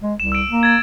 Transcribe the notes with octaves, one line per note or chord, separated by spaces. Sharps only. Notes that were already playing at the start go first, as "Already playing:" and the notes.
G#3
C2 E7
E6 D7
A#3
G#6 A6